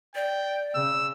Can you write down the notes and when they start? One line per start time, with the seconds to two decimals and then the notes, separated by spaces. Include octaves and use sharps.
0.15 D5 G5
0.75 C#3 E6